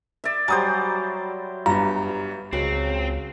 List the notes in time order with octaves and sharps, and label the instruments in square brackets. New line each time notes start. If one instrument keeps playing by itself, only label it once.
[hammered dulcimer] D5 E5
[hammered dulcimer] F#3 G3 C5 [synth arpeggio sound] G#5 D#6 [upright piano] A6
[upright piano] G1 G2 [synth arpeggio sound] A#5
[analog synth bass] C#2 [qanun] C#3 F#3 F#5 [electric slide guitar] C4